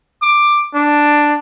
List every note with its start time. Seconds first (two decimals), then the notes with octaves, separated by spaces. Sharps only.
0.22 D6
0.75 D4